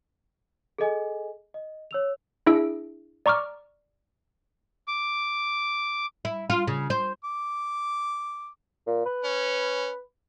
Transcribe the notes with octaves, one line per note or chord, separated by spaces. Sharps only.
G#4 A4 D#5 G#5
D#5
C#5 E6 F7
D4 E4 G#4 E5 E6 D7
D5 A#5 C#6 D6 F6
D6
E4
F4
C#3
C5
D6
A#2
B4
C#4